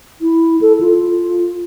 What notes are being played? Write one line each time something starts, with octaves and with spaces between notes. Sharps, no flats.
E4
A4
F4